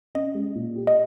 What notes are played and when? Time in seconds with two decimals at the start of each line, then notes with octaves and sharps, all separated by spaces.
0.15 C#4 D#5
0.35 G#3
0.55 A#2
0.76 G4
0.87 D#5